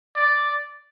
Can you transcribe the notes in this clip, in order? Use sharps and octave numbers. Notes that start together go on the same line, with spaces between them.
D5